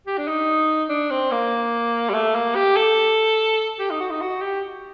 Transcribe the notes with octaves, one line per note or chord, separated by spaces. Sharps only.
G4
D4
D#4
D4
C4
A#3
G3
A3
A#3
G4
A4
G4
D#4
F#4
D#4
F#4
G4